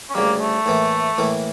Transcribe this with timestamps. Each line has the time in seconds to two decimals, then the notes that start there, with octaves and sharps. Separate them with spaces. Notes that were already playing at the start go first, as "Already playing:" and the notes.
0.09 C#4
0.15 D2 C#3 G3 A#3
0.40 A3
0.66 A2 E3 A#3
1.18 A2 E3 A#3